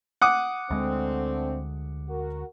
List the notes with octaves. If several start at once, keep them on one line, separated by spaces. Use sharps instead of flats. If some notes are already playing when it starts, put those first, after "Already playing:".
F#5 D6 D#6
D2 D3 G#3 A3 C4
F#4 A#4